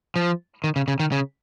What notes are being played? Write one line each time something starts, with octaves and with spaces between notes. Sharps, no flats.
F3
D#3
C#3
C#3
D#3
C#3